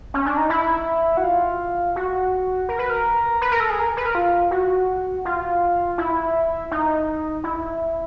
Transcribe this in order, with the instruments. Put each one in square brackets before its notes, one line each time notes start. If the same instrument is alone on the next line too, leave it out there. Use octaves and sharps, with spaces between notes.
[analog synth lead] C#4
D4
D#4
E4
F#4
F4
F#4
A#4
B4
A#4
B4
A#4
A4
G#4
A#4
B4
A#4
F4
F#4
F4
E4
D#4
E4